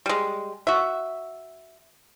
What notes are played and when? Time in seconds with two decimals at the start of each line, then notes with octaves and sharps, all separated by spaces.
0.06 G3 G#3
0.67 F#4 E5